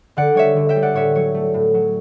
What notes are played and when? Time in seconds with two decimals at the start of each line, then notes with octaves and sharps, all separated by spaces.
0.17 D3 D5 F#5
0.35 G3 C#5 E5
0.56 D3
0.69 E5 G5
0.76 G3
0.82 D5 F#5
0.94 A2 C#5 E5
1.15 F#3 C#5
1.34 A3
1.54 A2
1.74 F#3